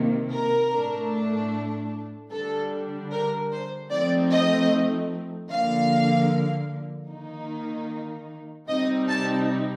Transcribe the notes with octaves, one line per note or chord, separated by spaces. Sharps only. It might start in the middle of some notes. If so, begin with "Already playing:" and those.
Already playing: C3 D#3 A#3
A#4
A2 A3 D4
D3 G3 D4 A4
A#4
C5
F3 A3 C4 D#4 D5
D#5
D3 F3 A#3 F5
D#3 A#3 D#4
C3 G3 C4 D#4 D#5
A5